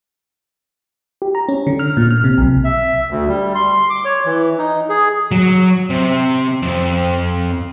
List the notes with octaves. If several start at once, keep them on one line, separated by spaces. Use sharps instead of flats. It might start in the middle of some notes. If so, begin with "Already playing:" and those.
G4
A#5
C#4
D3
F6
A#2
F6
C3
B1
E5
D2
G3
C6
D6
C#5
E3
D#4
G#4
F#3
C3
F2